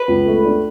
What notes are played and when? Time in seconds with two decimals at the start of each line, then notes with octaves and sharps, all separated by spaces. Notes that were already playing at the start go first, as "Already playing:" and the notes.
Already playing: B4
0.08 C#2
0.26 A3
0.44 D4